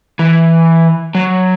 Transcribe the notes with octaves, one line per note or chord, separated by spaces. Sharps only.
E3
F#3